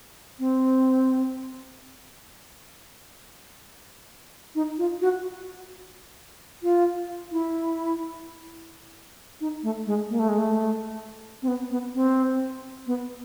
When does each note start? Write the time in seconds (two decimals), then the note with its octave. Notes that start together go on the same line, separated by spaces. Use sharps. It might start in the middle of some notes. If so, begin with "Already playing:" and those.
0.39 C4
4.55 D#4
4.78 F4
5.01 F#4
6.63 F4
7.32 E4
9.41 D#4
9.63 A3
9.86 G#3
10.10 A#3
10.19 A3
10.29 G#3
10.38 A3
11.42 C4
11.48 B3
11.71 B3
11.95 C4
12.87 B3